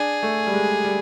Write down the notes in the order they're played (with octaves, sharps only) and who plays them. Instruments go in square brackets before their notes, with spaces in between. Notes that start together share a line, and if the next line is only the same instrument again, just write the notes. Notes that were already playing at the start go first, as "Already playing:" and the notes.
Already playing: [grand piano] D4 [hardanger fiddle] G#4
[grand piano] A3
G3
G#3
G3